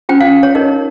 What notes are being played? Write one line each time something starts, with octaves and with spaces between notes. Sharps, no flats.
C#4 F4 C5 G5
F5
C#5
D#4 A#4 C#5 D#5